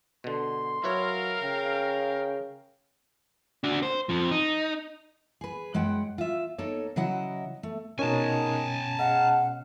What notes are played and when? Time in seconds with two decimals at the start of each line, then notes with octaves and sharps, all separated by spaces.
0.24 B2 D3 C6
0.84 F#3 E4 A#4 B4 C#5 F5
1.42 C#3 G5
3.64 D4 F#4
3.83 C5
4.09 F2 F3
4.31 D#4
5.41 G#4 B4
5.74 F#2 G#3 E4 F#5 G5
6.18 F4 E5
6.58 A#3 D#4 A4 C#5
6.96 C#3 F#3 E4 D#5 F#5
7.63 A3
7.99 B2 D#3 G#3 C#4 G#5 A5
8.99 G#3 F5 F#5